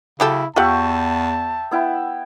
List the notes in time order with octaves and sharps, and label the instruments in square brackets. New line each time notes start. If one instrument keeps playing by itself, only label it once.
[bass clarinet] C#3 [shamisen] F#3 G4 A4 [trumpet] E4
[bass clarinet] E2 [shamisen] F4 G4 F#5 [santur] E5 G5 C#6 [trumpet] A5
[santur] B3 E4 G5